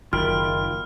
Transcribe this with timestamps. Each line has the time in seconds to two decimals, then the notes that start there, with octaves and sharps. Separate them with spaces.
0.13 F#1 D#3 F4 G5 B5 F6